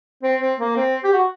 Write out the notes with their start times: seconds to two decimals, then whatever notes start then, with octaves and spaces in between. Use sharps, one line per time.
0.23 C4
0.41 C4
0.59 A#3
0.77 C4
1.04 G4
1.13 F#4